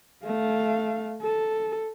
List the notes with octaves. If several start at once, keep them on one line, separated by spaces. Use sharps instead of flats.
A3 F5
A4